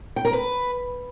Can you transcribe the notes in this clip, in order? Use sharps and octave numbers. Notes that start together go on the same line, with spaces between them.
G5
A#4
B4